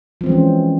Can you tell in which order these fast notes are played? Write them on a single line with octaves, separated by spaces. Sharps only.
F3 C4 E3 G#3 C#4